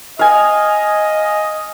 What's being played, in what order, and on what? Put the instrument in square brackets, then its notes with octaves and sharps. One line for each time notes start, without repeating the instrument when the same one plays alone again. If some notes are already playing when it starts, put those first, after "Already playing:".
[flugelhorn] D#5 [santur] F5 G#5